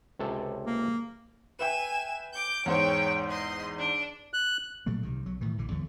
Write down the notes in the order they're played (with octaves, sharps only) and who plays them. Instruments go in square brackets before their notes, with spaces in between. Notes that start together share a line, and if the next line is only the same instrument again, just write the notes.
[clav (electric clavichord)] C#2 C3 A4
[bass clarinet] A#3
[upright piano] B4 E5 G5 [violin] G#5 E7
[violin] D6 G6
[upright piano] E2 G#2 C5 [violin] C#5 G5
[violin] D#5 C6
D4
[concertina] F#6
[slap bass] A#2 F#3 A3 A#3
C2 C3 D#3
B1 F#3
A2 D#3 E3
A#1 D3 E3
E2 D3 F#3